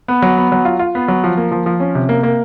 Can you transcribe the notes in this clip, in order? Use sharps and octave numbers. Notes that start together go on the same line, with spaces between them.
B3
F#3
B3
F#3
F4
F4
B3
F#3
F3
A#3
F3
F3
C#4
C3
A#3
A#3